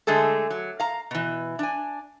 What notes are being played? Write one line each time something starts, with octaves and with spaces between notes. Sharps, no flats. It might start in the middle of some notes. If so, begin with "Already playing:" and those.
D3 G#3 A3 G#4 A4
F#3
F5 A#5
B2 E3
D4 G#5